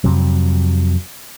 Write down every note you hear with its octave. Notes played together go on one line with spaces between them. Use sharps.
F2 C3 F#3